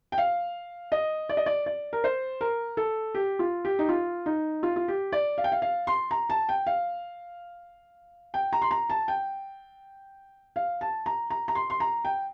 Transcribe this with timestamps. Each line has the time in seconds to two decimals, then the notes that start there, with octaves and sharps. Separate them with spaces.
0.12 G5
0.18 F5
0.92 D#5
1.29 D5
1.37 D#5
1.46 D5
1.66 D5
1.93 A#4
2.04 C5
2.41 A#4
2.77 A4
3.15 G4
3.39 F4
3.65 G4
3.79 D#4
3.89 F4
4.26 D#4
4.63 F4
4.76 F4
4.88 G4
5.12 D5
5.38 F5
5.44 G5
5.52 F5
5.62 F5
5.87 C6
6.11 A#5
6.30 A5
6.49 G5
6.67 F5
8.34 G5
8.53 A#5
8.62 C6
8.71 A#5
8.90 A5
9.08 G5
10.56 F5
10.81 A5
11.06 A#5
11.30 A#5
11.48 A#5
11.55 C6
11.70 C6
11.80 A#5
12.05 G5